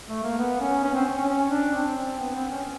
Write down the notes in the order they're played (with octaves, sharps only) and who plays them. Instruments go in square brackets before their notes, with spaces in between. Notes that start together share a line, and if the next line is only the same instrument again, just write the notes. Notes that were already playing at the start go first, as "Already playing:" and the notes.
[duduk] A3
A#3
B3
C#4
C#4
C4
C#4
C#4
D4
C4
B3
C4
C#4